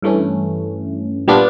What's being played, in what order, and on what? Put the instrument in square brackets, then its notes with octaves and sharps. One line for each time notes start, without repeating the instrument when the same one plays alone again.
[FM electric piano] G2 E3 A3 C#4
A#2 G3 B3 D4 F4